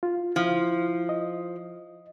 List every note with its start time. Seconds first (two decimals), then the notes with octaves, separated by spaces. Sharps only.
0.03 F4
0.36 F3 E4
1.09 D#5